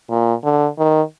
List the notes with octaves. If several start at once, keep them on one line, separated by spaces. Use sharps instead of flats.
A#2
D3
D#3